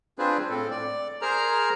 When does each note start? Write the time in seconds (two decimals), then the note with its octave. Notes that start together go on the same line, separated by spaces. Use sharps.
0.19 C4 D4 F4 G#4 B4 C5
0.49 A2 C4 A4
0.71 D5
1.22 G#4 A#4 C5 A#5 F6